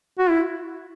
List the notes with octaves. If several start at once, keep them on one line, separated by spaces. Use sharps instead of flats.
F#4
E4